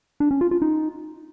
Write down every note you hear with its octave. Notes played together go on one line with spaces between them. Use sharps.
D4
C#4
F4
F4
D#4